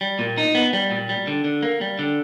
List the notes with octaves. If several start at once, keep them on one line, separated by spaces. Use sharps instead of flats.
G3
A#2
D#4
B3
G3
A#2
G3
D3
D3
A#3
G3
D3